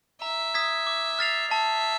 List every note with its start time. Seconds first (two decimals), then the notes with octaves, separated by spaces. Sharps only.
0.22 E5 A#5
0.54 D#6 G#6 B6
0.87 D6
1.19 F6 A6 C7 F7
1.51 E5 A5